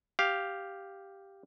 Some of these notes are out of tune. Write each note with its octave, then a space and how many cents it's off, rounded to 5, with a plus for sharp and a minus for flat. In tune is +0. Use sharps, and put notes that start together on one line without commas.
G4 +0 F5 +0